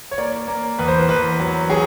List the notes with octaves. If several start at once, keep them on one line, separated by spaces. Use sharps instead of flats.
C#5
A#3 D5
A#3
E2 B4
C5
B4
E2 B4
F#3
F#3 G#4